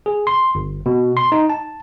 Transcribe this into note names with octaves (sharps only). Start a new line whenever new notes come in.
G#4
C6
G1
B2
C6
D#4
A5